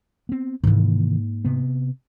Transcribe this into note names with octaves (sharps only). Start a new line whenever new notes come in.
B3 C4
G#2 C3 D#3 E3 A#3
C3 B3